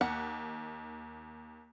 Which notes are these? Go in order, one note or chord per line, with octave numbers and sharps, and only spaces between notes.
D#2 F#5